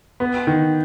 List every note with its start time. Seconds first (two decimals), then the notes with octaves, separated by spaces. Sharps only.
0.20 B3
0.47 D#3